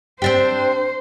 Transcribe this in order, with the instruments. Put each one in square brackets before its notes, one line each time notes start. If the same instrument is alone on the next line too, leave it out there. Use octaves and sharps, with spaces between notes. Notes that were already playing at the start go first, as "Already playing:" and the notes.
[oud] C4 D4 G4 [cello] C5